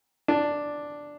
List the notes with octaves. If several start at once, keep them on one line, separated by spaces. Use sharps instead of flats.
D4